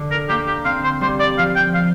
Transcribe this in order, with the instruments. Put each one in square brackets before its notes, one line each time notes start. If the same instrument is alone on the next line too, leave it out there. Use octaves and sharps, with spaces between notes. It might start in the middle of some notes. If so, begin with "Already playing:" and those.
Already playing: [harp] D3
[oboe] A#4
[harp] A#3 [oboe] G4
[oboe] G4
[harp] C4 [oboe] F5
[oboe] C5
[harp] G3 [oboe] C5
[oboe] D5
[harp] F3 [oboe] F5
[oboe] G5
F5